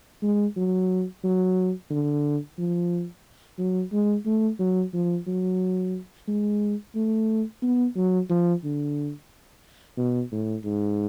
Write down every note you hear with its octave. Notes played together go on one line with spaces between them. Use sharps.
G#3
F#3
F#3
D3
F3
F#3
G#3
A3
F#3
F3
F#3
G#3
A3
B3
F#3
F3
D3
B2
A2
G#2